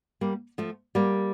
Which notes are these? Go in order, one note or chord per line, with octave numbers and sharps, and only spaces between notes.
G3 A#3
F3 A3
G3 A#3